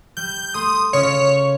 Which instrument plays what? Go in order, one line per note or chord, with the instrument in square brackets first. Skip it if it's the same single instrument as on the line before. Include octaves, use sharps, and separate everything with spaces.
[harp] G3 [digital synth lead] G6
[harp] A3 C6 [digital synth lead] D#6
[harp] C#3 C#4 F4 [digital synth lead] C#5